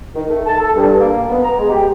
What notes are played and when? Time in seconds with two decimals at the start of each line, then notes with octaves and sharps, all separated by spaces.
0.15 D#3
0.29 A3
0.46 A5
0.60 A4
0.75 G2
1.00 A#3
1.29 B3
1.43 A#5
1.58 G#3
1.70 G4